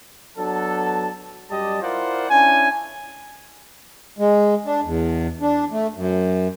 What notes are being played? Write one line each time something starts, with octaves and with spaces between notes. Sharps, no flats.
F#3 B3 D4 A4
F#2 G3 G4 D5 D#5 A5
E4 F4 A#4 C5 D5 F#5
C#4 D4 E4 G#5
G#3
D4
E2
D4
A3
F#2